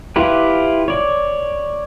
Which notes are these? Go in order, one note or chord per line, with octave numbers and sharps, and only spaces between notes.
E4 F4 G4 B4
C#5 D5